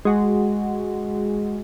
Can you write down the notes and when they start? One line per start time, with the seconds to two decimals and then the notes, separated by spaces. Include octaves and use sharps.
0.05 G#3 F#4